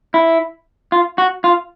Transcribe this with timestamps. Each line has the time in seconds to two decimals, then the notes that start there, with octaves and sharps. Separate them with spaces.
0.14 E4
0.92 F4
1.18 F#4
1.44 F4